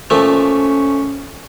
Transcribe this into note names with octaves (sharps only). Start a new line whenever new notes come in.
A#2 F3 A3 C#4